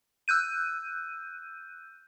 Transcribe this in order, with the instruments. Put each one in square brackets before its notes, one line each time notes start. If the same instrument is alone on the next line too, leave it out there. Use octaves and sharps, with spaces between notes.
[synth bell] E6 F#6 G6 D#7